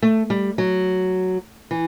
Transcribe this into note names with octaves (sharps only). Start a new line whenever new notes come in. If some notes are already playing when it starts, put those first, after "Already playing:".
A3
G3
F#3
E3